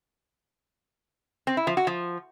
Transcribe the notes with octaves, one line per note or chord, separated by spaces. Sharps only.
C4
E4
F3
F#4
F3